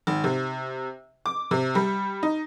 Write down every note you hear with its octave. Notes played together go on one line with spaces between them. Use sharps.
G#1
C3
D6
C3
G3
D#4